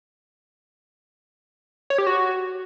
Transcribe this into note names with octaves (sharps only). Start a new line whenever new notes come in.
C#5
G4
F#4